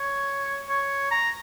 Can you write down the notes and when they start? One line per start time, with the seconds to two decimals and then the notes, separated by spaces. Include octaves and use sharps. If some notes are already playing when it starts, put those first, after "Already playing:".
Already playing: C#5
0.69 C#5
1.11 A#5